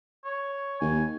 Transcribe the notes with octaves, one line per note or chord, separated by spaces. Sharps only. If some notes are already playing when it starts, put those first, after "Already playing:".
C#5
D#2 G#5